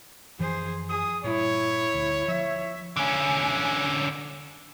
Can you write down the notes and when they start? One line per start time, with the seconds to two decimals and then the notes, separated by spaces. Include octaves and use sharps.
0.39 F#2 E3 F3 G#4 C5
0.89 G#4 D#6
1.24 G2 A#2 E4 C#5
1.94 D2
2.28 F3 E5
2.96 D3 C#4